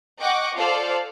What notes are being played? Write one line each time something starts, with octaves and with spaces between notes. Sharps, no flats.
D#5 F#5 G5 C#6 D6
F4 A4 C5 D5 F5